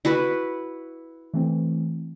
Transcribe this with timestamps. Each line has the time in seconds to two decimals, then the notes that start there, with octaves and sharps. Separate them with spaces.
0.05 E4 F#4 B4
1.34 E3 A3 C4